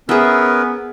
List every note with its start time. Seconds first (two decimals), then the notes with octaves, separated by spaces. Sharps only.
0.09 B3 C#4 G#4 A#4 B4 E5